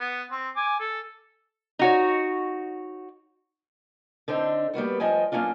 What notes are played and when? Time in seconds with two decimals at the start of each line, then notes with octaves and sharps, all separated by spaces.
0.01 B3
0.31 C4
0.56 G#5 D6
0.80 A4
1.79 D#4 F#4 C#5
4.28 D3 C4 D4 D#4
4.73 G3 A#3 B3 F#4
5.00 G2 F3 D#5 G5 G#5
5.32 F#2 G3 A#3 C#4 D4 F4